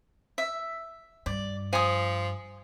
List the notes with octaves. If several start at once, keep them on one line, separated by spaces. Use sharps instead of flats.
E5
G2 D5
F3 G#5 D#6